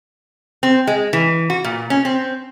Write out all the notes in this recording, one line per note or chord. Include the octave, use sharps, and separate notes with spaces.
C4
G#3
E3
F#4
A#2
C#4
C4